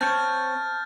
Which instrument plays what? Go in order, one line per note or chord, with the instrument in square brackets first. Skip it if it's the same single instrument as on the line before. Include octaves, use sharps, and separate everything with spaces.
[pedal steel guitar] C4 C#5 [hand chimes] A5 [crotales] F6 G6 A6